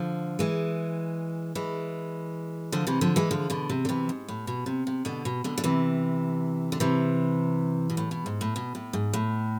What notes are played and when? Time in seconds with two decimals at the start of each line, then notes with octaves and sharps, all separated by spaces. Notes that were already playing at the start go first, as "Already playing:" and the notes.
Already playing: D3 F3
0.39 E3 G#3
1.55 E3 G#3
2.72 D3 F3
2.87 C3 E3
3.01 D3 F3
3.16 E3 G#3
3.31 D3 F3
3.50 B2 D3
3.70 C3
3.85 D3
3.89 C3 E3
4.09 G#2
4.28 A2
4.47 B2
4.66 C3
4.87 C3
5.05 B2 D3
5.25 B2
5.44 B2 D3
5.58 D3
5.64 C3 E3
6.72 D3
6.80 C3 E3
7.90 B2
7.97 A2
8.11 B2
8.26 G#2
8.41 A2
8.56 B2
8.75 A2
8.93 G#2
9.13 A2